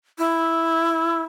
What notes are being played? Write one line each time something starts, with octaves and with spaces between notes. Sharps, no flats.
E4